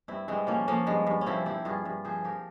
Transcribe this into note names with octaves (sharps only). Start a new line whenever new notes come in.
G2 C4 E4
G2 G#3 C4
F3 A#3 C#4
F3 A#3 C#4
G2 G#3
G2
C#4
F3 C4 E4
F3 E4 G4
G2 F4 G#4
G2
F3 G#4 C5
F3 G4 A#4